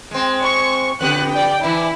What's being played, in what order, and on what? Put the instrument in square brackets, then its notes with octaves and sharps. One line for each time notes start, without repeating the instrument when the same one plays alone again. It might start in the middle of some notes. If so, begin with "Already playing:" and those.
[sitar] G#3 C4
[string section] C#6
[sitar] F2 B3 G4 [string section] D3 F#6
[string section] D5 G5
[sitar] E3 D4 [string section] E4